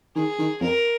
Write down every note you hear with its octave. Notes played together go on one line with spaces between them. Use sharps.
D#3 G#4
D#3
F2 A#4